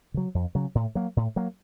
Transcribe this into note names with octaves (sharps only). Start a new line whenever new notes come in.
C#3 F#3
F2
C#3 F#3
A2
F#3 A#3
A2
F#3 A#3